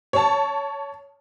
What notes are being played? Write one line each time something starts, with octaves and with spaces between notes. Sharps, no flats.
C#5 A5